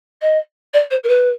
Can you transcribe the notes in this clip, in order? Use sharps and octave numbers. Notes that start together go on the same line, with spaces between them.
D#5
D5
C5
A#4
B4